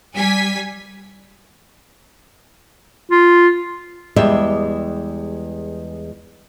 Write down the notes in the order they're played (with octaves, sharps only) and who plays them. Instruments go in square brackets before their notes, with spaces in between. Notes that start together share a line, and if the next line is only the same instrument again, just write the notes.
[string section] G3 G#5 B6
[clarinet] F4
[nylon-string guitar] E2 G3 G#3 G4 E5